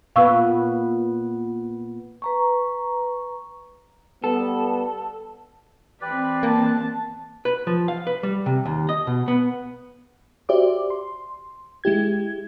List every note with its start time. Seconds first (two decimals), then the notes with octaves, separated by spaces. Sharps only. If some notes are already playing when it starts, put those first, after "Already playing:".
0.16 A#2 B3 B4 F5 C#6 E6
2.22 B4 A#5 C#6
4.24 G3 B3 A4
6.01 E3 C4 G4 B4 D5 B5
6.43 A#3 A5
7.45 B4
7.67 F3
7.88 F5
8.07 B4
8.23 G3
8.46 C3
8.65 D#2
8.89 D#5
9.07 B2
9.28 B3
10.49 F#4 G4 C5 D5 E5 D6
10.90 C6
11.84 G#3 E4 G4 G#6